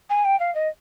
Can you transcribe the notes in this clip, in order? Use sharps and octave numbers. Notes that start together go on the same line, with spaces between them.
G#5
G5
F5
D#5